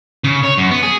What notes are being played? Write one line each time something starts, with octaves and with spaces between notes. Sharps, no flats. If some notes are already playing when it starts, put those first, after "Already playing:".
C#3
C#5
F#2
B3
G#4